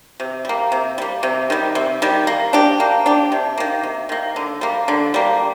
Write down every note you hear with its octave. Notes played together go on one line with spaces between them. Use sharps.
C3
G3 A#3
C3
G3 A#3
C3
D#3 G3
C3
D#3 G3
A#3
D4 G4
A#3
D4 G4
C3
D#3 A#3
C3
D#3 A#3
D3
G3 A#3
D3
G3 A#3